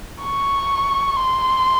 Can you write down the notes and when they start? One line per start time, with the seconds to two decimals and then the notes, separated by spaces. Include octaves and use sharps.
0.22 C#6
1.16 C6